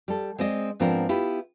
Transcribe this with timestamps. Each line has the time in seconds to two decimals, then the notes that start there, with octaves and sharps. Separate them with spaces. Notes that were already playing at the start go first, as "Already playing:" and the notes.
0.08 G3 A4
0.38 G#3 C4 D5 D#5
0.80 G#2 F3 B3 C4 D4 A#4
1.09 B3 E4 F4 G4